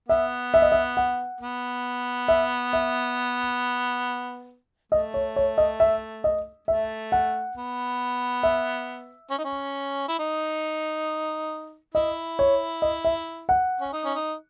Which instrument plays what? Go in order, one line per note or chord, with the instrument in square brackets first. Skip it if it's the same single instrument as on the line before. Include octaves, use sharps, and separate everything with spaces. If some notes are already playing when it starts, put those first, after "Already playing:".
[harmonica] B3 [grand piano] E5
[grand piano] E5
D#5
E5
F#5
[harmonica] B3
[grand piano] E5
E5
[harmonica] A3 [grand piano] D#5
[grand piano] C#5
C#5
D#5
E5
D#5
[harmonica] A3 [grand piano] E5
[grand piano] F#5
[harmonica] B3
[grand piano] E5
[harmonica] C#4
D#4
C#4
E4
D#4
[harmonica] E4 [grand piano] D#5
[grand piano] C#5
D#5
E5
F#5
[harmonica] C#4
D#4
C#4
D#4